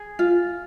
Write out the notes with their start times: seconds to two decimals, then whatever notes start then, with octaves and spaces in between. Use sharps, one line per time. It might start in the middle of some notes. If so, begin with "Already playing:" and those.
Already playing: G#4
0.19 F4